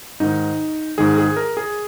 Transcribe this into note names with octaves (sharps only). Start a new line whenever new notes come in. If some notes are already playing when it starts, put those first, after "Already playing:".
G#2 D#3 D#4
G#2 D#3 G#4
G#4
A#4
G#4